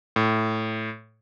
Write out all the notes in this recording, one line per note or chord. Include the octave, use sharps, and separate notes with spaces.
A2